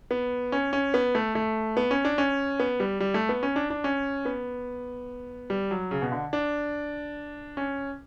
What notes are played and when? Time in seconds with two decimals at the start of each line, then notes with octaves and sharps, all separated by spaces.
0.11 B3
0.52 C#4
0.73 C#4
0.94 B3
1.15 A3
1.35 A3
1.77 B3
1.91 C#4
2.05 D4
2.18 C#4
2.59 B3
2.80 G3
3.00 G3
3.14 A3
3.29 B3
3.43 C#4
3.56 D4
3.70 D4
3.84 C#4
4.25 B3
5.50 G3
5.71 F#3
5.91 C#3
6.02 B2
6.12 D3
6.33 D4
7.57 C#4